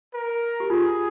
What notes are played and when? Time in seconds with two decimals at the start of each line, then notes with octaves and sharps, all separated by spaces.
0.14 A#4
0.60 G4
0.70 F4 G#4